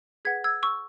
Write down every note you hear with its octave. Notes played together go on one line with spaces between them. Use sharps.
G#4 B4 F#5 G#6 B6
E6 G#6
C#6 E6